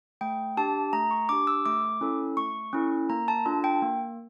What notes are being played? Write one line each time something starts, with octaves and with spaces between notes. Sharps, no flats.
A3 G5
D4 G4 A5
A3 A#5
C#6
D4 G4 D6
E6
A3 D6
C#4 E4 A4
A3 C#6
C#4 E4 A4
A#3 A#5
A5
D4 F4 A4 A5
G5
A#3